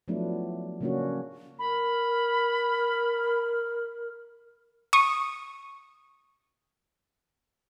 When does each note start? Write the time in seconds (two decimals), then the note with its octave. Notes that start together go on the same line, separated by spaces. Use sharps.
0.08 F3 F#3 A3 B3 D4 E4
0.81 C#3 F#3 A#3 C#4 D4 F#4
1.59 A#4 B5
4.93 C#6 D#6